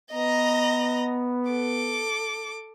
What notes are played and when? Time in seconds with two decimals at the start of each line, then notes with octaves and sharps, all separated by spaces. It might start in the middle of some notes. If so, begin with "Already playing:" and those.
0.12 B3 D#5 A#5
1.50 A4 D6